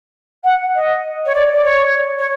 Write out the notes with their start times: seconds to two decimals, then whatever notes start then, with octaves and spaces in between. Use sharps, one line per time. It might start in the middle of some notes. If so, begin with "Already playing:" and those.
0.44 F#5
0.75 D#5
1.25 C#5
1.34 D5
1.53 D5
1.64 C#5
2.18 C#5